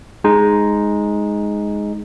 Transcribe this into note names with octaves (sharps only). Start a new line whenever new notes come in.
G#3 D#4